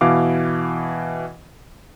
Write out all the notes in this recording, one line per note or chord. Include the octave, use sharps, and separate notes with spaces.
B2 E3 F5 D6